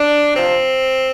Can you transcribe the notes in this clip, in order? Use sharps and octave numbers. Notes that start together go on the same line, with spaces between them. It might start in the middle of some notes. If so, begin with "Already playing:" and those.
Already playing: D4
C3 F3 C4